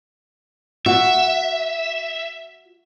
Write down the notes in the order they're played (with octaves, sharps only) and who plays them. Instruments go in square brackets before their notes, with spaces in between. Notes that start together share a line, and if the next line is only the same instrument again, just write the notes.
[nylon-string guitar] F#4 [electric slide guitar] E5